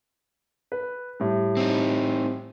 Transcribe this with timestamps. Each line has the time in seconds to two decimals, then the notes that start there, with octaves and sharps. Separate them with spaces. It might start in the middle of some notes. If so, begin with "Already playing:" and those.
0.72 B4
1.20 A2 G3
1.57 C4 D#4